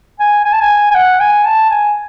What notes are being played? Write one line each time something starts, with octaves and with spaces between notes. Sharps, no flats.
G#5
G#5
A5
G#5
G#5
F#5
G#5
A5
G#5